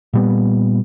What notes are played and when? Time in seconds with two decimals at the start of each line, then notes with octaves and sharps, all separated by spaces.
0.13 A#2 G3 B3